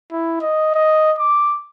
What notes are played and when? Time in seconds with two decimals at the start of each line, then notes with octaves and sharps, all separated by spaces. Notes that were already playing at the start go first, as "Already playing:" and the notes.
0.12 E4
0.41 D#5
0.74 D#5
1.18 D6